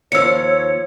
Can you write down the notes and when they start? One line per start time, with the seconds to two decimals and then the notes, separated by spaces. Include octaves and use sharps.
0.12 D#2 F3 C#5 E6 C#7